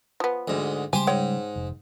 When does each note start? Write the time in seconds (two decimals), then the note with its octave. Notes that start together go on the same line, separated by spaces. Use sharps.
0.20 F3 B3
0.48 D2 G#2
0.93 C#3 G3 G#3 G4 C5 G#5
1.07 G#2 C#5 G5
1.56 F1